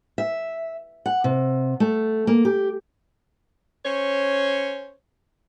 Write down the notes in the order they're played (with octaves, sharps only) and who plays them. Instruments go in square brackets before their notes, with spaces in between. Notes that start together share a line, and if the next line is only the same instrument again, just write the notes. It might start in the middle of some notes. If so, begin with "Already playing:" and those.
[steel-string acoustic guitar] E5
F#5
C3
A3
A#3
G4
[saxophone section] C#4 C5 C#5